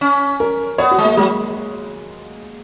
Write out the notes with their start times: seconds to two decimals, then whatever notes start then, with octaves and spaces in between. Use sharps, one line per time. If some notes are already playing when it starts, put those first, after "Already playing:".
0.01 C#4
0.40 A#4
0.78 B3 C#5
0.91 F#4
0.98 G#3
1.04 A#3
1.17 F#3 G#3